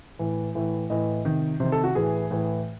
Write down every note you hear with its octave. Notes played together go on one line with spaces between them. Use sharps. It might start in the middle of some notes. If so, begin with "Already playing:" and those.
A2 E3
A2 E3
A2 E3 D#5
C3 D#3
C3 D#3 C5
A4
F#4
A2 E3 G#4
A2 E3